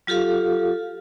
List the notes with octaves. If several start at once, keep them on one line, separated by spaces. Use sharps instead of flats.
F#3 F4 G4 A4 F5